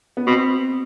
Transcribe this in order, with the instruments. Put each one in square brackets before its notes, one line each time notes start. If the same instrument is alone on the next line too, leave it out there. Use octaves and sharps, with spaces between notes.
[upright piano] B3
[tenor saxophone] B2 [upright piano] C4